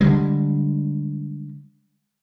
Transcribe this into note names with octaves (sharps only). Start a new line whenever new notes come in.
D3 E3 G3 G#3